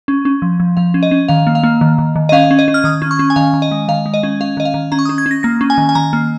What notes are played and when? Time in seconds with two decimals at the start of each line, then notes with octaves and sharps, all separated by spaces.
0.08 C#4
0.25 C#4
0.42 F3
0.60 F3
0.77 F3 F5
0.94 C#4
1.03 D#5
1.11 C#4
1.28 D#3 F5
1.47 A#3
1.55 F5
1.63 A#3
1.81 D#3
1.98 D#3
2.16 D#3
2.29 D#5
2.32 C#4 F5
2.51 C#4
2.59 D#5
2.68 C#4
2.74 F6
2.84 D#3 D#6
3.02 C#4
3.11 C#6
3.19 C#4
3.30 G#5
3.36 D#3 F5
3.54 D#3
3.62 D#5
3.71 G#3
3.88 D#3 F5
4.06 G#3
4.14 D#5
4.23 C#4
4.41 C#4 F5
4.57 D#3 D#5
4.65 F5
4.74 D#3
4.92 C#4 A#5
4.99 C#6
5.05 D#6
5.09 C#4
5.18 G#6
5.26 C#4
5.31 A#6
5.43 A#3 A#6
5.61 C#4
5.70 G#5
5.78 D#3
5.89 G#5
5.95 D#3 A#5
6.13 A#3